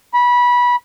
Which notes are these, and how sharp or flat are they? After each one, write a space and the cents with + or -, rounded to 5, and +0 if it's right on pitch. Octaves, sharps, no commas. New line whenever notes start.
B5 -20